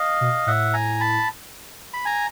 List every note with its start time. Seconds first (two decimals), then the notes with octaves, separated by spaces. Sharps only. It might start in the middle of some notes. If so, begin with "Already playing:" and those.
Already playing: D#5 F5
0.21 B2
0.46 A2 E5 F#5
0.74 G#5 A#5
1.01 A5 B5
1.94 B5
2.05 G#5 A#5